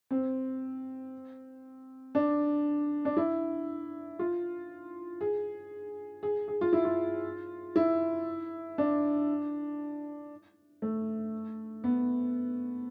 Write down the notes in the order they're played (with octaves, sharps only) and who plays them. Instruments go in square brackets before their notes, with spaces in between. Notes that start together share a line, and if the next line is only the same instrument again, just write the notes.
[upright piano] C4
D4
D4
E4
F4
G#4
G#4
G#4
F4
E4
F4
E4
D4
A3
B3